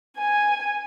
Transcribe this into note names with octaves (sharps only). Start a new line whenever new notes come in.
G#5